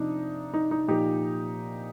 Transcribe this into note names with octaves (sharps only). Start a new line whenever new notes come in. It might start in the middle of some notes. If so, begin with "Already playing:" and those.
Already playing: C3 F3 D4 D#4
D#4
D#4
A#2 F3 D#4 G4